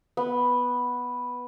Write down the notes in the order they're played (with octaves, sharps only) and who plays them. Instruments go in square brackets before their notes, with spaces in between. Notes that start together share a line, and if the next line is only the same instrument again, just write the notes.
[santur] B3